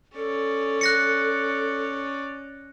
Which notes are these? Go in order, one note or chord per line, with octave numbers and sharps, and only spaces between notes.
C#4 A4 D5
F#6 A#6 C#7